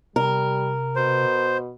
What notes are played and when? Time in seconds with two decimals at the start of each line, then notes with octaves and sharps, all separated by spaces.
0.16 C3 G3 A#4
0.96 B2 C5